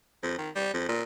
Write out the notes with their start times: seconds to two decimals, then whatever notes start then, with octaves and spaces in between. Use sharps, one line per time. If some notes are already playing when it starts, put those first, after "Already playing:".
0.23 F2
0.38 D#3
0.55 G3
0.74 F2
0.88 A#2